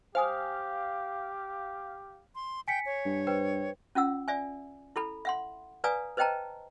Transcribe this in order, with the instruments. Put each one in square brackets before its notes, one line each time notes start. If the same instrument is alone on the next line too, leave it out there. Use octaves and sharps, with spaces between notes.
[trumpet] G4 [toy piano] C5 G#5 D#6 [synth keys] F5
[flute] C6
[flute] G5 [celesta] G#5 B6 C#7
[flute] C#5
[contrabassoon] G2
[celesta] B4 C5 G5
[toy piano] C#4 F4 F#5 E6
D5 E5 G#5
E4 A4 B5
E5 F#5 C6
B4 D5 F5 G#5 A#5 D#6
B4 C5 D#5 G5 A5 A#5